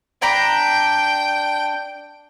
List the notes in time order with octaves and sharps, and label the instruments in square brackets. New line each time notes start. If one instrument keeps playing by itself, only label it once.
[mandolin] D4 A#5 B5 [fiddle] G5